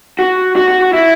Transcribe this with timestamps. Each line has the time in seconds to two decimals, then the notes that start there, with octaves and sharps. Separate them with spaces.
0.19 F#4
0.56 F#4
0.68 F#4
0.81 F#4
0.93 E4